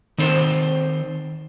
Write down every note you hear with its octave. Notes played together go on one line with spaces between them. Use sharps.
D#3 C4 A4 C5 F#5 A5